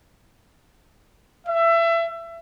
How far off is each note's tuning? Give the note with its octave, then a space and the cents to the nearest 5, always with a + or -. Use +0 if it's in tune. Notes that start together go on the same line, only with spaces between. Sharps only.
E5 +25